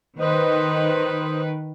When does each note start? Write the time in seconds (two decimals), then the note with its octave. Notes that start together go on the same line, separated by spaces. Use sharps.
0.20 D#3 B4 C5 D#5